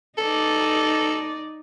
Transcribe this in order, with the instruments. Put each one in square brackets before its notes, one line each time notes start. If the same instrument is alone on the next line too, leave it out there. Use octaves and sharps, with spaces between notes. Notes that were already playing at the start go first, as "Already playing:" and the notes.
[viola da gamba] D#4 D5 [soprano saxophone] A4